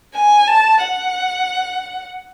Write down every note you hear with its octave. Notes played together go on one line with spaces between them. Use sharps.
G#5
A5
F#5